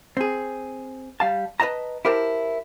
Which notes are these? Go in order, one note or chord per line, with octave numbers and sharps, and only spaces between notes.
C4 G#4
G3 F5 A5
B4 C5 D#5 A5 A#5
E4 G4 A#4 C5 A5